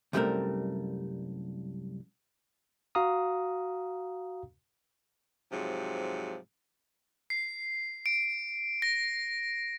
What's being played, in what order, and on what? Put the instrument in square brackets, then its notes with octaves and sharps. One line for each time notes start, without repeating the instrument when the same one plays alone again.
[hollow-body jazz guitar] C2 F#2 G3 A3 C4 A#4
[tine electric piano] F#4 F5 A#5 D#6
[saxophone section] G#2 C3 F3 F#3
[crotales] C7
D7
A#6